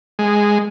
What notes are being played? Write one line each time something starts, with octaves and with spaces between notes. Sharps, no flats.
G#3